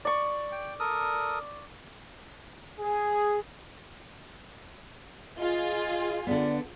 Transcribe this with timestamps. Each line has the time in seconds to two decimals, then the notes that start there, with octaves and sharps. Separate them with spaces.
0.05 D5 C#6
0.52 G5
0.80 A4 A#4 D#6
2.80 G#4
5.39 F4 G#4 D#5
6.27 D3 B3 D5